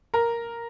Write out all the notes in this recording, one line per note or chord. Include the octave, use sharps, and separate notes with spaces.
A#4